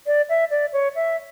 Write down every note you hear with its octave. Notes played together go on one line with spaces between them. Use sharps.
D5
E5
D5
C#5
E5